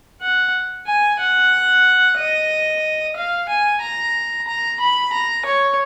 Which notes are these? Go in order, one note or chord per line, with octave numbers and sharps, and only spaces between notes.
F#5
G#5
F#5
D#5
F5
G#5
A#5
A#5
B5
A#5
C#5